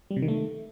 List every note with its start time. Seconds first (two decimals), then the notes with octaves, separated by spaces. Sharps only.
0.11 G3
0.16 C3
0.22 D#3
0.28 A3